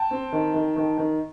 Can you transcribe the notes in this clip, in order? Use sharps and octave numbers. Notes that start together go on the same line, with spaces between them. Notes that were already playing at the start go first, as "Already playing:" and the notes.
Already playing: G5 A5
C4
D#3
D#3
D#3
D#3